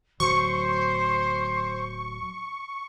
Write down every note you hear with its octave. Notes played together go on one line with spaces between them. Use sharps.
D1 F#3 C5 C#6